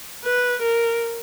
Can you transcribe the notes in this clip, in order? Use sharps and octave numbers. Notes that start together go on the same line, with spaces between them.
B4
A#4